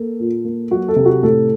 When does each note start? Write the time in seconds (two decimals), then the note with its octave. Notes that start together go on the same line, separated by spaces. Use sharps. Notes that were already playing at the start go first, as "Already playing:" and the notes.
Already playing: A#3 A4
0.20 A#2
0.45 A#3
0.71 F#3 F#4
0.88 A4
0.96 C3
1.05 F#4
1.23 A2 A4